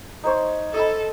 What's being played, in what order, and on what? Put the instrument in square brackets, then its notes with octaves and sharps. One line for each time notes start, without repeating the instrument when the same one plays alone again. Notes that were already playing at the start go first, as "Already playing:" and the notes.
[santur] D#4 C5 C#5
[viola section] A4 [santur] D#5 E5 B5